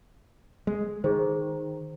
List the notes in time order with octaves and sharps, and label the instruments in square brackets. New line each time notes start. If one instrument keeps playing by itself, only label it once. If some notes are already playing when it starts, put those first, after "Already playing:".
[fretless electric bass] G#3
[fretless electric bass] D#3 [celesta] G#4 C5